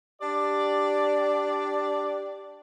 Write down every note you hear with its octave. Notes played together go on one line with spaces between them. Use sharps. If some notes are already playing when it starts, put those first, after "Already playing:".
D4 G4 D5